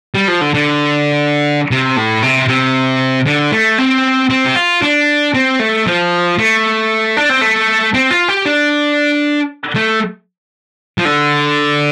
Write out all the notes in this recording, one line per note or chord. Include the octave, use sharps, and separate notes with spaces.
G3
F3
D3
D3
C3
A2
C3
C3
D3
A3
C4
C4
G4
F4
D4
C4
A3
F3
A3
D4
C4
A3
C4
F4
G4
D4
A3
F3
D3